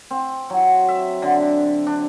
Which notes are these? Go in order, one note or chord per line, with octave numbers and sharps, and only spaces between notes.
C4
F#3
E5
D3
D4